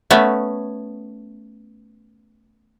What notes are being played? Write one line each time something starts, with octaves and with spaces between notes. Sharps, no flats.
A3 B3 C#4